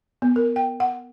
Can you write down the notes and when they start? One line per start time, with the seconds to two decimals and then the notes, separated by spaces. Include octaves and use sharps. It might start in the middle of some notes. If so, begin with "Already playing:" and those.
0.22 B3
0.36 A#4
0.56 G5
0.80 F#5